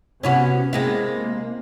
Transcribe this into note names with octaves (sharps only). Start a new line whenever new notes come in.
C3 B3 C#4 E4 F#4
C3 G#3 A#3 E4